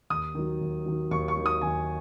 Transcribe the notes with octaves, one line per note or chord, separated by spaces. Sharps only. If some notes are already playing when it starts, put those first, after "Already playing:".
D#2 D#6
D#3 F#3
D#2
D#3 F#3
D#2 C#6
C#6
D#3 F#3
D#6
D#2 G#5